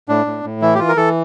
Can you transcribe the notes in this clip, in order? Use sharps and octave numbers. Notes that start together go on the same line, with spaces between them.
A2 D4
A2
A2
E3 E4
G4
E3 F4
A#4
E3 A4